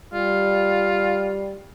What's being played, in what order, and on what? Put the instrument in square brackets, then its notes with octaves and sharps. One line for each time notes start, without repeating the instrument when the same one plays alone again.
[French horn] G3 [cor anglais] F4